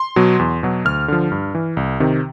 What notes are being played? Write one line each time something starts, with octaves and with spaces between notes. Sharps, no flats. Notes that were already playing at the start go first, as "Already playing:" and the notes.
Already playing: C6
B2 F#3
E2
B2 F#3
D2 F6
D3 F3
G2
E3
C2
C3 D#3